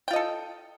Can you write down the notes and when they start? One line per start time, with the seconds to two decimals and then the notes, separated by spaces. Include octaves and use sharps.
0.08 G5
0.11 F4
0.13 D#5
0.16 A4